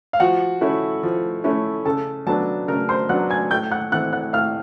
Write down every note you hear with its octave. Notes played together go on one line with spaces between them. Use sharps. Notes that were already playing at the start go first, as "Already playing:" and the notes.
F5
F3 F#4 F#5
A3 C#4 E4
F3
A3 C#4 E4
C#3 A4 A5
F#3 B3 D4 A4 A5
C#3 A#4 A#5
C5 C6
F#3 B3 D4 F#5 F#6
G#5 G#6
A2 G5 G6
F#5 F#6
E3 A3 C4 F#5 F#6
F#5 F#6
A2 F5 F6